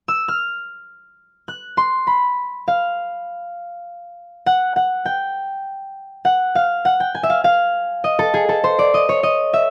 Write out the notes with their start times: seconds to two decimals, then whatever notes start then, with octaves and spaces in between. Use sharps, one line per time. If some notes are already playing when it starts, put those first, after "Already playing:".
0.08 E6
0.28 F6
1.48 F#6
1.77 C6
2.07 B5
2.68 F5
4.46 F#5
4.76 F#5
5.06 G5
6.25 F#5
6.55 F5
6.85 F#5
7.00 G5
7.15 G#5
7.23 E5
7.30 F5
7.44 F5
8.04 D#5
8.19 A4
8.34 G#4
8.49 A4
8.64 C5
8.79 D5
8.94 D#5
9.09 C#5
9.23 D#5
9.54 E5